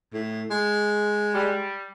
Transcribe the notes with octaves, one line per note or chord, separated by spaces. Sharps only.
A2
G#3
G3